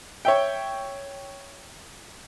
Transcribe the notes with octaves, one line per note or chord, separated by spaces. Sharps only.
C#5 E5 G5